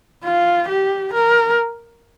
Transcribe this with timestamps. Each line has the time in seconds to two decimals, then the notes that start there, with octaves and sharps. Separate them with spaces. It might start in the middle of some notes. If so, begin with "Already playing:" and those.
0.24 F4
0.68 G4
1.13 A#4